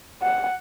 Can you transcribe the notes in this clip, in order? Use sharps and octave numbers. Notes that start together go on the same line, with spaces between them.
F#5